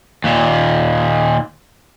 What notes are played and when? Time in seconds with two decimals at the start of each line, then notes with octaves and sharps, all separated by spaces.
0.24 D#2 A#2